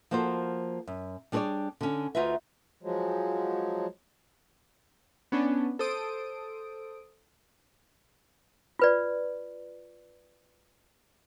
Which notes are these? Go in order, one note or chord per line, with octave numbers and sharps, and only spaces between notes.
F3 A#3 F#4 A4 C5
F#2
G3 D4 G#4 B4 C#5 D5
D3 C#4
D2 D#4 F4 F#4 B4 E5
F3 F#3 G#3
B3 C#4 D4
A4 C5 D#6 D7
F4 B4 D5